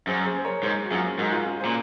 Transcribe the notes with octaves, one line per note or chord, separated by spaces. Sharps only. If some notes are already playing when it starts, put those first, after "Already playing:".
F#2 G#4 C5
G#4 C5
C5
A#4 C#5
G#2 G#4 C5
F#4
F#2 F4 G#4
G#2 F#4 A#4
F4 G#4
C#4 F4
A#2 G#4 C5